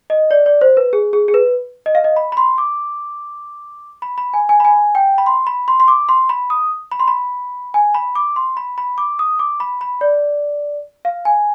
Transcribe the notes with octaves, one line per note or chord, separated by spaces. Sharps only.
D#5
D5
D5
C5
B4
G#4
G#4
G#4
B4
D#5
F5
D#5
B5
B5
C6
D6
B5
B5
G#5
G#5
B5
G#5
G5
B5
C6
B5
C6
C6
D6
C6
B5
D#6
B5
C6
B5
G#5
B5
D6
C6
B5
B5
D6
D#6
D6
B5
B5
D5
F5
G#5